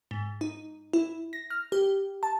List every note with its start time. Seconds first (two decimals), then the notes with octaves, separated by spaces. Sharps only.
0.11 G#2
0.41 D#4
0.93 E4
1.33 A#6
1.50 F6
1.72 G4
2.23 A5